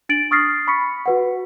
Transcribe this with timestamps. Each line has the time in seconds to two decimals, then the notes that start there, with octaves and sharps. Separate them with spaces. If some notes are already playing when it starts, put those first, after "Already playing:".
0.09 D4 A6 D7 F#7
0.31 C#6 D#6 F6 A6 A#6 C7
0.67 B5 C#6 B6 C#7
1.06 F#4 B4 F#5